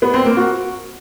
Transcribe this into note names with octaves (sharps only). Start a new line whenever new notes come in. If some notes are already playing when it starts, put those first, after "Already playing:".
B3
C4
A#3
F#4